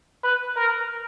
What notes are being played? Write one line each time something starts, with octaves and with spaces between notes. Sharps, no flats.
B4
A#4